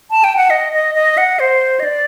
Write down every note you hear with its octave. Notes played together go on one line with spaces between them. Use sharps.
A5
G5
F#5
D#5
D#5
D#5
F#5
C5
D#5
D5